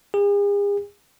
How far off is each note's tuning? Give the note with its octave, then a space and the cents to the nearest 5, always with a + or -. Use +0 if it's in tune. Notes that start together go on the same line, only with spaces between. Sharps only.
G#4 -45